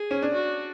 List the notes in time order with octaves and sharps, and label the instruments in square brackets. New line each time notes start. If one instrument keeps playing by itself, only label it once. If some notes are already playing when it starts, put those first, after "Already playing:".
Already playing: [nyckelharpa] G#4
[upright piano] C#4
D4
[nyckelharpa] F#4